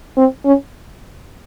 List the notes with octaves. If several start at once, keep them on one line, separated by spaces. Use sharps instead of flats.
C4
C#4